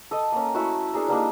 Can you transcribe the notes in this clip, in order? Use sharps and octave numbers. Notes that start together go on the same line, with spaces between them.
A4 D#5
A#3 C#4
A3 E4 F#4 A#4
D4 G#4 A#4
G3 A#3 D4 D#4